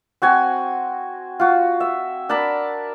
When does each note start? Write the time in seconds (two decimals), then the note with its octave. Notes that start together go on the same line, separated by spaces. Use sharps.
0.22 C4 F#4 G#5
1.40 F4 F#4
1.80 E5
2.29 D4 A#4 A5 B5